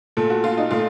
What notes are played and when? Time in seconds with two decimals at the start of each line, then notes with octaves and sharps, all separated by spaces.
0.17 A#2 A3 A4
0.30 F#4
0.44 F4
0.57 D#4
0.71 A#2 A3 F4